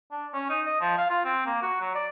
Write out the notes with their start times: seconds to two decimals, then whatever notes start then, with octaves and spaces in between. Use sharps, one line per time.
0.11 D4
0.33 C#4
0.49 D#4
0.66 D#5
0.81 F3
0.98 F5
1.10 F4
1.25 C4
1.46 A#3
1.62 F#4
1.80 F#3
1.95 D5